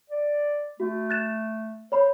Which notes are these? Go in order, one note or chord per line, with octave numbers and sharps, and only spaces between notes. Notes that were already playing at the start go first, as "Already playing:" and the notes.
D5
A3 F#4
F#6 A6 E7
C5 C#5 B5